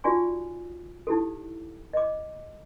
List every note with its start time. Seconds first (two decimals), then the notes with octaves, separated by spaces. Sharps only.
0.04 D#4 F4 F#4 D5 G#5 C#6
1.07 D#4 E4 G4 A4
1.93 D#5 D6